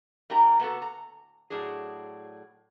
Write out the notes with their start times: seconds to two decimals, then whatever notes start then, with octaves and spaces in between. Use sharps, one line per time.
0.30 G3 A#3 D#4 G4 A#5
0.60 A#3 B3 F#4 A4
0.82 A#5
1.50 A2 F#3 D4 G#4